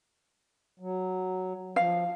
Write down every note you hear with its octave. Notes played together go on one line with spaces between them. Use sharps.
F#3
F3 F5